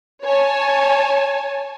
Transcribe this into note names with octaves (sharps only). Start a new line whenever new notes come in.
C#5 G#5 A5